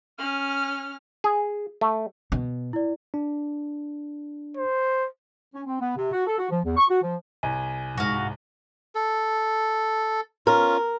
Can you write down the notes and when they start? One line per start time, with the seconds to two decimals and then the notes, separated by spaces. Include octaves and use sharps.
0.19 C#4 F6
1.24 G#4
1.81 A3
2.32 B2
2.73 E4 D5
3.14 D4
4.57 C5
5.53 C#4
5.66 C4
5.80 B3
5.97 C3
6.13 F#4
6.27 A4
6.38 F#4
6.50 F3
6.64 E2
6.77 C#6
6.89 F#4
7.02 F3
7.43 C2 G#5
7.98 G#2 F#4 F5
8.95 A4
10.47 C#4 F4 A#4